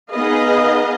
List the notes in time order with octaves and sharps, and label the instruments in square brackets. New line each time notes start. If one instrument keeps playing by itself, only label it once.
[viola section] B3 D#4 G#4 B4 D#5 F5